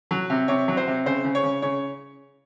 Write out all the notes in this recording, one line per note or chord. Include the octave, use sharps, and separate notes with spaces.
F#3
C3
C3 C#5
F#3
C5
C3
C#3 C5
C#3
C#5
C#3
C#3 C#5